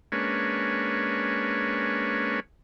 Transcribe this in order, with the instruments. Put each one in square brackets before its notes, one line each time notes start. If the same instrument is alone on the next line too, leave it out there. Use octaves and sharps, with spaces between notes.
[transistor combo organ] G#3 A#3 C#4 D4 B4 C#5